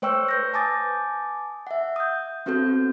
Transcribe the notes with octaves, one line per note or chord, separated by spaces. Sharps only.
A3 C5 C#5 G5 C#6 E6
B4 G6 A#6
G#5 A5 D6 D#6 A6
E5 F#5
D#6 G6
B3 C4 F#4 A4 G6